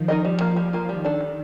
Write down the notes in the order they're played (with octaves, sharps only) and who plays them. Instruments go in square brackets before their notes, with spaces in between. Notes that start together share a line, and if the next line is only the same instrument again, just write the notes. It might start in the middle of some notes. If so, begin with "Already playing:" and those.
Already playing: [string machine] D#3 F3
[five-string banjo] D#4 A#4 D#5
G3
A#3 F4
G3
A#3 F4
[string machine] D#3 [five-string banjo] G3
[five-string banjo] D4 A4
G3